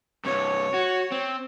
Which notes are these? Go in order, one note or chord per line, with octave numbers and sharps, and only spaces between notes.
G2 C3 C#5
F#4
C4